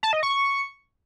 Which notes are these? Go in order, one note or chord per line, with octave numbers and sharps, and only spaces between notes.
A5
D#5
C#6